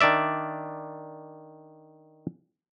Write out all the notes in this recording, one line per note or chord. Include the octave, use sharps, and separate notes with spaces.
D#3 D4 D5 E5